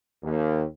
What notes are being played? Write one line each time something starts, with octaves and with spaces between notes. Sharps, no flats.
D#2